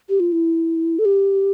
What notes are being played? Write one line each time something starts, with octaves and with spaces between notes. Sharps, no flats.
G4
F4
E4
A4
G4